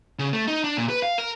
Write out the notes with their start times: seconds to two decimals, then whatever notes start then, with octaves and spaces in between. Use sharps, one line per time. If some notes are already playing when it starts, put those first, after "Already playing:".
0.19 C#3
0.33 A3
0.47 D#4
0.64 D4
0.77 A#2
0.89 B4
1.03 F5
1.18 A#4